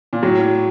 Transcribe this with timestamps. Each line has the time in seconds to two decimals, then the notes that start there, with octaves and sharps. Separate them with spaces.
0.13 A#2
0.23 A2 F#3